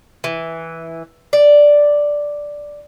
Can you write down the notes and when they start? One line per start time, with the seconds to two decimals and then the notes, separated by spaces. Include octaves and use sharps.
0.24 E3
1.33 D5